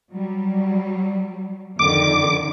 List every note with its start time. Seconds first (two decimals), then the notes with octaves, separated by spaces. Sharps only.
0.12 F#3 G3
1.79 F2 D3 D#3 D6